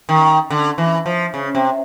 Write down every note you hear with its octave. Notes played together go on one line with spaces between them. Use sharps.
D#3
D3
E3
F3
C#3
C3